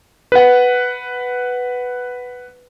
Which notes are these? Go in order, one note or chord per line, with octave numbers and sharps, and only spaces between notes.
B4 F#5